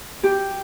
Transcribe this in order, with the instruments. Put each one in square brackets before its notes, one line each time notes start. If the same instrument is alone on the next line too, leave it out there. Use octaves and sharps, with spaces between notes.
[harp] G4